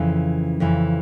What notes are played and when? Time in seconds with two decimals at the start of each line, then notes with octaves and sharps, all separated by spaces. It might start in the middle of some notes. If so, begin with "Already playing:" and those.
Already playing: F2 C#3 E3
0.60 F2 C#3 E3